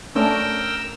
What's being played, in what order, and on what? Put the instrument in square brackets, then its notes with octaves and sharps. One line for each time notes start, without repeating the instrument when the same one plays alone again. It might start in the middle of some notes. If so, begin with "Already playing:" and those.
[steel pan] A3 C#4 D4 [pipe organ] A#4 G5 E6